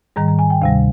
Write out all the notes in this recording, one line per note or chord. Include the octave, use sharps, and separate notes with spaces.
G#2 D#3 G3 A#5
A#5
G#5
G5
D2 C3 G3 F5